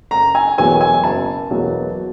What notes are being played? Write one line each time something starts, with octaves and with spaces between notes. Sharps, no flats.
F#1 A#5
G#5
E2 B2 F#3 A#3 G#5
G#5
F#1 A5
E2 B2 F#3 A#3